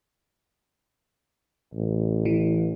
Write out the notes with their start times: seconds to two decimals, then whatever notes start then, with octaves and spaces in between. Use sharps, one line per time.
1.74 A1
2.25 E3